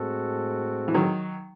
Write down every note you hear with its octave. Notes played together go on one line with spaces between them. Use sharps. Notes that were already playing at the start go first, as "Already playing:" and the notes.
Already playing: A2 G#3 C4 F#4 A4
E3
D#3 F#3